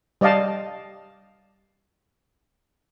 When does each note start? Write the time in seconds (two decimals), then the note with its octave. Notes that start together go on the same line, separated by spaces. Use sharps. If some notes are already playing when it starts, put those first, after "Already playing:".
0.21 G3 D5 D#5 F5 A5